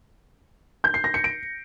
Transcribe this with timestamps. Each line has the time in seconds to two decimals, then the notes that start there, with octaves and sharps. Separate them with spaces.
0.84 G6
0.94 C7
1.04 A#6
1.14 C#7
1.24 D7